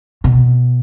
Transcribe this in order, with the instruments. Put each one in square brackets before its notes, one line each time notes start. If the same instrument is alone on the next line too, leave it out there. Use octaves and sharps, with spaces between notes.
[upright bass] B2